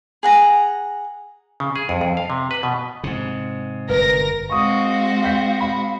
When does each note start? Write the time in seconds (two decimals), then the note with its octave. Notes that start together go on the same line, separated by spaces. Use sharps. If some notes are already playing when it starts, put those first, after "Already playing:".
0.23 G#4 F#5 A#5
1.60 C#3
1.76 G#4
1.89 F2
2.01 F2
2.17 F5
2.30 C3
2.51 B4
2.63 B2
3.04 G#2 C3
3.89 G1 A#4 B4 A#6
4.50 G#3 C4 F#4 F5 C#6 D#6
5.23 G5 G6 B6
5.60 B5